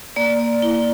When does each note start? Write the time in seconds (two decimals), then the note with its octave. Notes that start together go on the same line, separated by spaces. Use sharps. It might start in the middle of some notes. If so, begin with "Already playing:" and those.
0.16 A#3 D5
0.40 D5
0.62 E4